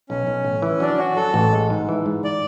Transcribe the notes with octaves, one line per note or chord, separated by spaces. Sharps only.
B1 C#4
B1
A1
E3
F#3 D4
C#4 F#4
F#3 A4
A1
G#3
G#2
E3
G#2
D5